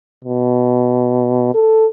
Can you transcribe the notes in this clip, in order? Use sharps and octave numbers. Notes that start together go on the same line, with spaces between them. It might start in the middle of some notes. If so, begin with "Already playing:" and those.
B2
A4